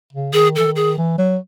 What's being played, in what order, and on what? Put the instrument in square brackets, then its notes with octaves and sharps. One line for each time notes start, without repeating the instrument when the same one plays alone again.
[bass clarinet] C#3
[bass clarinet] D#3 [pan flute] G#4
[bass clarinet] E3 [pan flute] A4
[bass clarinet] D#3
[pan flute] G#4
[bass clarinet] E3
F#3